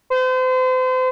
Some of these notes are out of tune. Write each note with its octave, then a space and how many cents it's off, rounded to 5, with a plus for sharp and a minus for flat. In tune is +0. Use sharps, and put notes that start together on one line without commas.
C5 -35